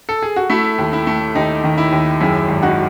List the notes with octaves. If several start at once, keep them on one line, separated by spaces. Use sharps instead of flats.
A4
G#4
F#4
A3 E4
D#2
E4
A3
D#2 D#4
D#3
E4
D#2
F#2 E4 G#4
G#1
D#4 F#4